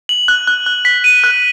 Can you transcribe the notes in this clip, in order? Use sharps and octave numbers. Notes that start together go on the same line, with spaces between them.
F#7
F#6
F#6
F#6
B6
D#7
F#6